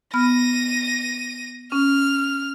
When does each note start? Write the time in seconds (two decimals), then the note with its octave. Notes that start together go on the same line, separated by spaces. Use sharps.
0.14 B3 B5 F6 A#6 D#7
1.72 C#4 F6